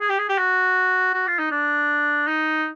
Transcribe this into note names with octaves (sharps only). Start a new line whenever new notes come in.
G#4
G4
G#4
G4
F#4
F#4
F4
D#4
D4
D#4